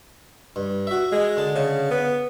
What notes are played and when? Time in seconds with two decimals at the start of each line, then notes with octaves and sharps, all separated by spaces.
0.56 G2
0.87 F#4 E5
1.12 G#3
1.37 D3 A5
1.55 C#3
1.91 B3